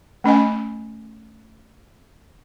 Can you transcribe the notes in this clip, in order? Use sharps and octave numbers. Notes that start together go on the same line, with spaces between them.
A3 C#4 D#5 G#5